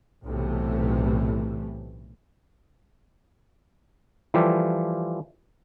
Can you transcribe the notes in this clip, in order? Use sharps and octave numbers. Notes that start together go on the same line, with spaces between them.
B1 A2 C3 E3 A3
E3 F3 G3 F4 G4 A4